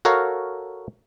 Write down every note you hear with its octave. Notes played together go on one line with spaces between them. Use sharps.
F#4 A4 A#4 C#5 F5